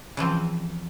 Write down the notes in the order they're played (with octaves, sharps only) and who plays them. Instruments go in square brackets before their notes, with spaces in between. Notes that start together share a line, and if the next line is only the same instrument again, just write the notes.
[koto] C#3 E3 F3 C4